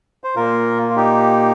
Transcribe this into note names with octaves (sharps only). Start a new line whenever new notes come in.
C5
A#2 A#3 F4 A#4
F4
D#4 G4